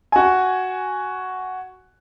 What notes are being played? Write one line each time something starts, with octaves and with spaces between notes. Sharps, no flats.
F#4 G#5